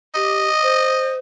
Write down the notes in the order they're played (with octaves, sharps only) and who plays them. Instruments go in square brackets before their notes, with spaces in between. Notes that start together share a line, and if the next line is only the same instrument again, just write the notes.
[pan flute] G4 [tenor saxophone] D#5
[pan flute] C5